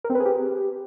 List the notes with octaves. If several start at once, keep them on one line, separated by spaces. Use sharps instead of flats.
A#4
C4
B4
G#4
G4